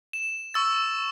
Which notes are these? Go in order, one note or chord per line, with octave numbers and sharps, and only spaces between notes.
E7
C#6 E6 A6